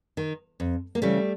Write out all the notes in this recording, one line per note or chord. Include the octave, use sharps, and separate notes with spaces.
D#3
F2
A#3
C#3 E3 G3 A3